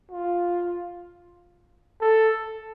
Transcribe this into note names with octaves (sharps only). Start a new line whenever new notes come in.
F4
A4